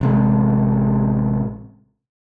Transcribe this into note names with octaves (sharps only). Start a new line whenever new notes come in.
A1 C3 G#3